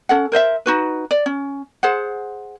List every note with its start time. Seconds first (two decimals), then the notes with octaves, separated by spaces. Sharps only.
0.09 C#4 A4 F#5
0.32 A#4 C5 D#5 E5
0.66 D#4 F#4 B4
1.11 D5
1.26 C#4
1.83 G#4 C5 F#5